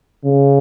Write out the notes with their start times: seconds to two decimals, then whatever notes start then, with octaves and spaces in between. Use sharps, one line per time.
0.25 C#3